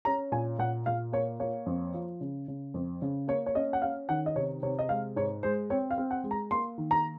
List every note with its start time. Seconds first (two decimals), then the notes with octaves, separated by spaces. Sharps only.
0.05 C#4 A#5
0.32 A#2 G#5
0.59 A#2 F#5
0.86 A#2 F5
1.12 A#3 C#5
1.40 A#3 C#5
1.66 F2
1.94 F3
2.21 C#3
2.48 C#3
2.74 F2
3.02 C#3
3.28 A#3 C#5
3.46 C#5
3.55 C#4 D#5
3.73 F#5
3.82 C#4 F5
4.09 D#3 F#5
4.26 D#5
4.36 C3 C#5
4.63 C3 C#5
4.79 D#5
4.89 G#3 F5
5.16 G#2 C#5
5.43 G#3 C5
5.70 C4 C#5
5.91 F5
5.98 C4
6.11 F#5
6.24 G#3
6.31 A#5
6.51 A#3 C6
6.78 D#3
6.91 A#5